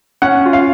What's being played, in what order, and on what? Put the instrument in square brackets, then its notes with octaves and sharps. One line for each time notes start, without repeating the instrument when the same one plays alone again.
[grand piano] C#4 [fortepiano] F#5
[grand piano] F4
[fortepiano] F5